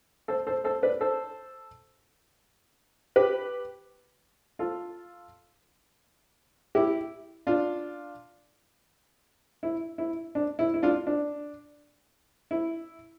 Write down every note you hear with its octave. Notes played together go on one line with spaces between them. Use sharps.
A4 C5
A4 C5
A4 C5
B4 D5
A4 C5
G4 B4
F4 A4
E4 G4
D4 F4
E4
E4
D4
E4
E4
D4 F4
D4
E4